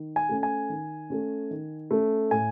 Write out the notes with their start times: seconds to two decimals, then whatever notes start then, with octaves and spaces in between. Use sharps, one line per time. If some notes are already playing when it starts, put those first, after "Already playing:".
Already playing: D#3
0.16 G#5
0.29 A3 C#4
0.43 G#5
0.69 D#3
1.10 A3 C#4
1.51 D#3
1.91 A3 C#4
2.31 A2 G#5